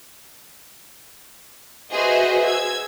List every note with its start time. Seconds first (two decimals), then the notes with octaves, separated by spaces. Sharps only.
1.92 F#4 G#4 B4 C5 D#5 E5
2.44 E6 G#6